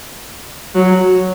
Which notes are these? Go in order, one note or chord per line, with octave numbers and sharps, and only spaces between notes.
F#3